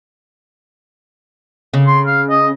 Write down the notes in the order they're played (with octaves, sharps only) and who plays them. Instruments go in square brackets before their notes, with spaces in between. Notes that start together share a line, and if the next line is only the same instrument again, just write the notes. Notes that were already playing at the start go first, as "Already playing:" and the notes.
[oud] C#3
[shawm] C6
F5
D#5